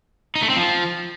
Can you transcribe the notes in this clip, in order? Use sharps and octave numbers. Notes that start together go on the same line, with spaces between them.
D#4
A3
C4
F3